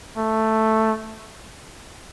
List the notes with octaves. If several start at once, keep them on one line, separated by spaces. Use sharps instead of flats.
A3